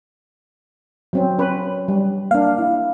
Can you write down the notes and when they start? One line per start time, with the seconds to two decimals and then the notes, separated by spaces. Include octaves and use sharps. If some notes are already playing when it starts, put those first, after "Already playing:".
1.13 F#3 C4 C#4
1.39 C#4 B4
1.88 G3
2.31 A#3 D4 F5
2.58 E4